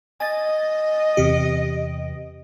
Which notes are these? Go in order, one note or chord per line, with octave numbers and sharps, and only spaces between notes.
D#5 G#5 A6
E2 C3 G4